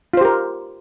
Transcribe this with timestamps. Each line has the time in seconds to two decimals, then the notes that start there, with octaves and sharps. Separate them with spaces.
0.13 F4
0.17 C5
0.21 G4
0.25 A#4